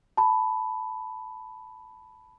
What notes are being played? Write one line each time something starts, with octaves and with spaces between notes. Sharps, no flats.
A5 B5